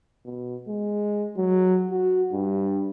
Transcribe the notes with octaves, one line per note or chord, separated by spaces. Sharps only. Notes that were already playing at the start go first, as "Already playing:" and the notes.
B2
G#3
F#3
F#4
G2